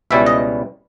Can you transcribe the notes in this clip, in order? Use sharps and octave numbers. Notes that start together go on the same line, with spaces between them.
C#2 B2 G3 C#4 E4 E5
D#5